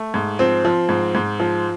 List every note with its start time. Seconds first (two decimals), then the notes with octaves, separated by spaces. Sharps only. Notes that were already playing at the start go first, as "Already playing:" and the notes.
Already playing: A3
0.14 G#2
0.39 F3 C4
0.65 F3
0.89 G#2
1.15 G#2
1.40 F3